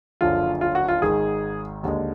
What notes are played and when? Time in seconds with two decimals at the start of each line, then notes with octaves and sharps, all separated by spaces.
0.21 F#1 F#2 D3 F3 F4
0.61 F4
0.75 F#4
0.88 F4
1.02 G#1 G#2 D#3 G#4
1.83 D#2 D3 G#3